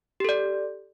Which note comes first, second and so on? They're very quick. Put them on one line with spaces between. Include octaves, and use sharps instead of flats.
G4 A4 D5